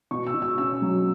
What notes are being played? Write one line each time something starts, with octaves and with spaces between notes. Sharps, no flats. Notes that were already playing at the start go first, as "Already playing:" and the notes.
B2 C#6
E6
B2
E6
C#4 E6
F#3